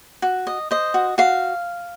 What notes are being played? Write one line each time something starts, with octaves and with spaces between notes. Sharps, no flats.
F#4
D#5
C5 D#5
F#4
F#4 F5